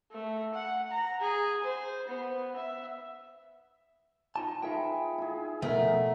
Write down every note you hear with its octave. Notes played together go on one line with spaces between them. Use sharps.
A3
F#5
A#5
G#4
C5
B3
E5
D#4 F4 A5
D#4 F4 G#4 B4 E5 G5
E4 G#4
B2 F3 A3 A#4 F#5 G5